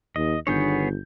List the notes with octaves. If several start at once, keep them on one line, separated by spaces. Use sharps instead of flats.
D#2 D#5
G1 D3 D#3 B3 G#4 C#5 G6